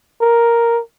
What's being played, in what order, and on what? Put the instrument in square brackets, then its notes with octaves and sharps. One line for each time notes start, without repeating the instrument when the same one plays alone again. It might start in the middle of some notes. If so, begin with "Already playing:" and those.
[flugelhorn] A#4